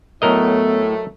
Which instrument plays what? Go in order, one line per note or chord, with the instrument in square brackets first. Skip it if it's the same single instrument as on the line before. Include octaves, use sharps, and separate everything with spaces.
[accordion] A2 [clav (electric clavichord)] F#3 A#4 D#5 [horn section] A3 [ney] B3